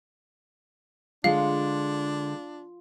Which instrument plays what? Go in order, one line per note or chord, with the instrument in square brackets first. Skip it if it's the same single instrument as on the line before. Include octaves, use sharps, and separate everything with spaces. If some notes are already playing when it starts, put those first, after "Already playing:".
[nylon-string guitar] D3 G#3 [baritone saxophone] D4 [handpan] F4 [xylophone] F5